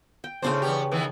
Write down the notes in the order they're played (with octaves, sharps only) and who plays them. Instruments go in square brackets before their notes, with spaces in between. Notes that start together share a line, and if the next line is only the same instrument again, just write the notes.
[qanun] G5
[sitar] A2 C5 [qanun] C#3 C#4 D4
[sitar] E2 B3 G4
D#3 E3 B3